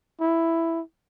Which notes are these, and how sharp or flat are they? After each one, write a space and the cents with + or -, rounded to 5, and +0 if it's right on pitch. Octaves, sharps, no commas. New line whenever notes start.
E4 +5